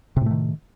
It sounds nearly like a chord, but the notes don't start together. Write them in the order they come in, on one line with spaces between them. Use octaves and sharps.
C3 A2 A3 D#3